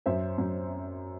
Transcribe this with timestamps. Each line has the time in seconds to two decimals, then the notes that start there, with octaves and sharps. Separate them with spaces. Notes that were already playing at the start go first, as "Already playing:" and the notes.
0.06 F#2 C5 E5
0.38 F#2